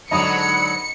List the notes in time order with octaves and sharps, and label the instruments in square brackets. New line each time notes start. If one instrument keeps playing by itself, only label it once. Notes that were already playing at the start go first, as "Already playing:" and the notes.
[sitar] G#2 D3 F#3 [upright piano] D#5 A#5 D#6 [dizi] B5 [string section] C#7